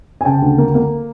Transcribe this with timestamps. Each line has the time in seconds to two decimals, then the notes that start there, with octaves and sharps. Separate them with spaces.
0.21 G#5
0.25 C#3 G5 A5
0.42 D2
0.58 A#3
0.75 A#3